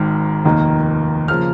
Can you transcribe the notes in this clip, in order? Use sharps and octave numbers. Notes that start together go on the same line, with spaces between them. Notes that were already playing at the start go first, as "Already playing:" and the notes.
Already playing: G#1 G#2 D#3 F6
F1 D#2 D#3 A#3 D#4
C#3 F3 A#3 F6